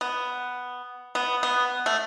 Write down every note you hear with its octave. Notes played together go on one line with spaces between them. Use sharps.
B3
B3
B3
A3